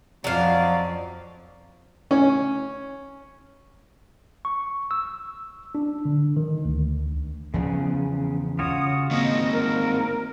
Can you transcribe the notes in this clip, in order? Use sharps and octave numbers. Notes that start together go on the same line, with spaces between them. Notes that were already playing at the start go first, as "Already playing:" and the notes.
F2 F#3 D5 F5
C#4
C#6
E6
D4
D3
D#3
D2
E2 C#3 F3 B3
C#3 F4 F#4 C#5 D#6
D#3 A#3 C4 D#5
A#4